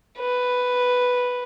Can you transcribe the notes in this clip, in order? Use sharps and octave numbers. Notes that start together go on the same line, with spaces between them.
B4